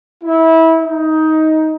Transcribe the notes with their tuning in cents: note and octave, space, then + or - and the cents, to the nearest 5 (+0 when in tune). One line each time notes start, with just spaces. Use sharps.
E4 -25
D#4 +15